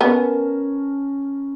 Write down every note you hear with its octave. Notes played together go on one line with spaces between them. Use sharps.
B3 C#4 A#4 A5